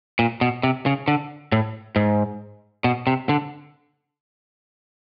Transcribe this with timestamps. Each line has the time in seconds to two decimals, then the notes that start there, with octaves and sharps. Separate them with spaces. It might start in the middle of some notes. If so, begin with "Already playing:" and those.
0.19 A#2
0.41 B2
0.63 C3
0.86 C#3
1.08 D3
1.52 A2
1.96 G#2
2.84 B2
3.07 C3
3.29 D3